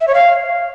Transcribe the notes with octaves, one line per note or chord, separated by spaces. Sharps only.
E5
C#5
F5